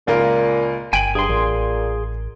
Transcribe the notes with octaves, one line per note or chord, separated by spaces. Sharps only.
C#2 A#2 F4 A#4
G1 G5 G#5 D7 F#7
G2 G#4 C6
A1 A#2